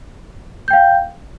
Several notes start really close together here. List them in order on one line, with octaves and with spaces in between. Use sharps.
G6 G5 F5